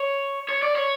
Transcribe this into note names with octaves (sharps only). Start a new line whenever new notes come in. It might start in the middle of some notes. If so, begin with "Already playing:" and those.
Already playing: C#5
C#5
D5
C#5